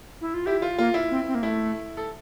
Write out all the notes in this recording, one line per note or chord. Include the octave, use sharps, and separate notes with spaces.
E4
F4
E4 G4
F4
A#3 F4
E4
C4
C4
A#3
A3 E4
A4